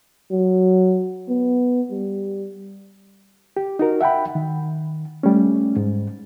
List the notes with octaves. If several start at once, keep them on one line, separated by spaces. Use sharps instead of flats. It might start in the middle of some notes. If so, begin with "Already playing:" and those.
F#3
B3
G3
G4
D#4 F#4 A#4
E5 F#5 G5 B5
D#3
G3 A3 C#4
G#2